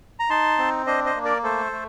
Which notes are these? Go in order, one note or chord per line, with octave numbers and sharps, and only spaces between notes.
A#5
D#4 A5 C6
C4
D4 C5 D#5
C5 D#5
A#3
A#4 D5
A3 A4 C5
A3